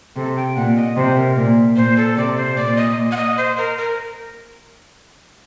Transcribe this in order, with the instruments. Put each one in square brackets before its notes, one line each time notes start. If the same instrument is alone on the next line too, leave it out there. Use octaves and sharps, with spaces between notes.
[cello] C3 [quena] A4
[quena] G5
[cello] A#2 [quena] F#5
[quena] D#5
[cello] C3 [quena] C5
[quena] A#4
[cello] A#2 [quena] A#4
[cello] A#2 [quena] C5
[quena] A4
[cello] C3 [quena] D5
[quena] C5
[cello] A#2 [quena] D5
[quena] D#5
F#5
D#5
C5
A#4
A#4